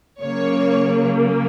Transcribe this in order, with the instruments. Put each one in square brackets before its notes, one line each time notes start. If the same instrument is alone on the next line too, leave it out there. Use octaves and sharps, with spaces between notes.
[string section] C#3 F#3 A#3 C#5